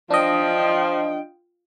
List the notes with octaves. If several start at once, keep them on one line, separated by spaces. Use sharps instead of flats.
F3 D4 F4 D#5 G5